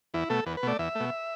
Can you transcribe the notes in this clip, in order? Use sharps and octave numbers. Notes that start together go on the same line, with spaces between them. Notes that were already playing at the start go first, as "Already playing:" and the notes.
E2 E4
B2 A3 A4
E2 B4
B4
B2 A3 D5
E2 E5
A3
B2